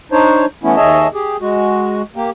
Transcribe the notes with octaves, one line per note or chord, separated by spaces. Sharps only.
D4 D#4 C5 C#5
E3 A3 B3 C#4 E4
D#2 G#4 C#5 D#5 E5 A5
G4 G#4
G#3 F#4
A#3 G4